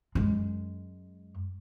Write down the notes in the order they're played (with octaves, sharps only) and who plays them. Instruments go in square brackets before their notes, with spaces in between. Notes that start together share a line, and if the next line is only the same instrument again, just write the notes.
[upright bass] F#2 G#3